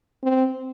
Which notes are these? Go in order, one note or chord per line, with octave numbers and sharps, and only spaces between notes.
C4